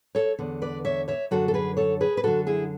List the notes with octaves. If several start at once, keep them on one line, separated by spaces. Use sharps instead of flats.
A4 C#5
E2 D3
B4 D5
C#5 E5
C#5 E5
F#2 D3 F#4 A4
A4
G#4 B4
A4 C#5
G#4 B4
B4
F#2 D3 F#4 A4
E4 G#4